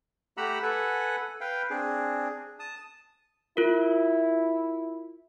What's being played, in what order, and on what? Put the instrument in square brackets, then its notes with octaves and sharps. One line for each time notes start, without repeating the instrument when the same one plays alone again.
[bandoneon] A3 G4 F#5 A#5 B5 E6
A4 B4 F#5 G#5
B4 F5 G5
C4 D4 G#4
A5 D#6
[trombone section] E4 [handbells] F4 A#4